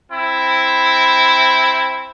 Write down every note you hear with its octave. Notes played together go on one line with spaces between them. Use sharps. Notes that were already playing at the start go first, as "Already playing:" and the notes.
C4 E4